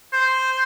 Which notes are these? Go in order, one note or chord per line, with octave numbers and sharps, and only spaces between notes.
C5